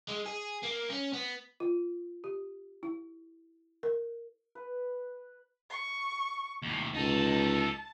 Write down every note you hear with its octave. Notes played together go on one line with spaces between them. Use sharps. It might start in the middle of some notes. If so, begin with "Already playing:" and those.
G#3
G#4
A#3
C#4
B3
F4
G4
E4
A#4
B4
C#6
D#2 A2
C#2 D#4 A4 A5